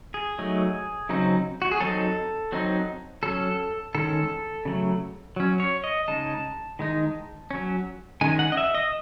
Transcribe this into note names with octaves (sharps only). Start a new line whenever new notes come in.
G#4
F#3 A3 D#4
C#3 F#3 C4 D#4
F#4
G#4
F#3 C4 D#4 A4
F#3 C4 D#4
F#3 C#4 A4
D#3 G#3 C#4 A4
C#3 F#3 A3
F#3 C#4
C#5
D#5
C#3 G#3 D#4 A5
D#3 G#3 D#4
F#3 C#4
D#3 G#3 C#4 G#5
F#5
D#5
E5
D#5